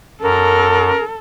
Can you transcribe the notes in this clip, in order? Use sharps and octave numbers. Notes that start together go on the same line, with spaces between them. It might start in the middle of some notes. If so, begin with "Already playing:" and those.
F#2 A4 A#4